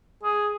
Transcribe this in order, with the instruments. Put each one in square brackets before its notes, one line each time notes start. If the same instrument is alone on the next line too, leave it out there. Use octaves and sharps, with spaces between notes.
[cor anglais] G#4